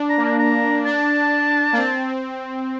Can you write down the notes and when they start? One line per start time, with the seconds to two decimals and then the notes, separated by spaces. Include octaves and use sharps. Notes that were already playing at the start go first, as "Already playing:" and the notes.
Already playing: D4
0.09 A#5
0.17 A#3
0.25 A#5
0.39 A#5
0.86 D4 A5
1.73 A#3
1.78 C4